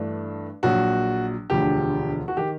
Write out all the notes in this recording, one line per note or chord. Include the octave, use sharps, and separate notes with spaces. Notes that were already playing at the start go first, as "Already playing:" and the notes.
Already playing: G2 E3 A3 D4
A#1 A#2 F#3 F#4
E1 D2 D3 F3 G4
F#4
D#3 G4